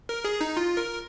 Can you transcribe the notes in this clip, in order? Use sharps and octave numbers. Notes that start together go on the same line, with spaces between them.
A#4
G#4
D#4
F4
A#4